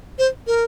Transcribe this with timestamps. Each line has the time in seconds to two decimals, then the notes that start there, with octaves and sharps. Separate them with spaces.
0.18 C5
0.47 A#4